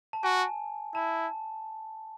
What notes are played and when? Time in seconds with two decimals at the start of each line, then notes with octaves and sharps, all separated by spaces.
0.13 A5
0.23 F#4 G#5
0.95 E4 A5